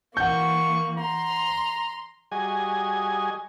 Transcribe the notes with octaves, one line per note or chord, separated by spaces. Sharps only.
E3 A#3 F#5 C#6 G6
A#5 C6
G3 F#4 G#4 D#5 G#5